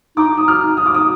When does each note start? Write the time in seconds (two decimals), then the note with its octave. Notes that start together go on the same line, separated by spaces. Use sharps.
0.17 D#4 D6
0.38 D#6
0.47 D#4 F6
0.77 D#6
0.86 D6
0.94 D#6